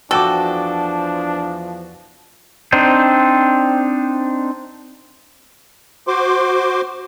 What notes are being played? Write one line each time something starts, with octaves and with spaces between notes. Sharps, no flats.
E2 F3 D4 F#4 A4 G5 D6
C4 D4 D#4 C5
F#4 C5 C6 D6